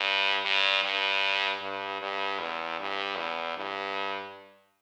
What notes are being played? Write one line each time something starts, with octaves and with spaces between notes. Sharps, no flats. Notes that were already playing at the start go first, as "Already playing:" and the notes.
Already playing: G2
G2
G2
G2
G2
E2
G2
E2
G2